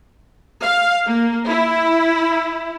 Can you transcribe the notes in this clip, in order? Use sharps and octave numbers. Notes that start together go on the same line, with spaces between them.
F5
A#3
E4